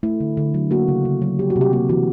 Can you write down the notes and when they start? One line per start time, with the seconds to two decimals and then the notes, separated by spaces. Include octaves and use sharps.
0.03 A3 E4
0.20 D3
0.37 D3
0.54 F#3
0.71 A#3 F#4
0.88 C#3
1.05 C#3
1.22 F#3
1.39 G3 G4
1.50 F#4
1.56 C3
1.61 G4
1.73 A#3 G4
1.89 E3 F#4